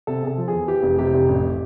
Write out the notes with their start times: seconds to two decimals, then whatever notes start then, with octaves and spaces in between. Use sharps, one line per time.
0.07 C3 A4
0.23 C3 G#4
0.27 A4
0.38 F3
0.48 E2 G#4
0.68 E3 G4
0.83 F1
0.98 C3 G4
1.14 F1
1.28 A1